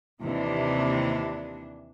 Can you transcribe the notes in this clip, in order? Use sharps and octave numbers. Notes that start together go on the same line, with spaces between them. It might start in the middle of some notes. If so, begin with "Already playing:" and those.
D#2 C3 E3 D4